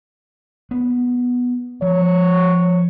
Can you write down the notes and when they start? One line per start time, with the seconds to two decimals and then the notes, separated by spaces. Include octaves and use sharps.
0.71 B3
1.82 F3 C#5